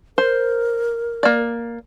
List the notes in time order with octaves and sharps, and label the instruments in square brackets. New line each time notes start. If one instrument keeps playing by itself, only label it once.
[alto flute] A#4 [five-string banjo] C5
[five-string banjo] A#3 D5